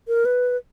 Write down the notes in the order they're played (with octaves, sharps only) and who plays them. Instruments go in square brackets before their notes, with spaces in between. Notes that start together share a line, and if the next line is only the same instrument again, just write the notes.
[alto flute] A#4
B4